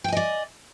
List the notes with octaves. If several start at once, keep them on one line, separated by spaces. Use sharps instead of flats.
D5 D#5 G5 G#5